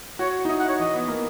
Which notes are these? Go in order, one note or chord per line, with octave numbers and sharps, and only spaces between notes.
F#4 C#5
D#4
E4 D#5
F#5
C#5
E3 D#5
B3
A#3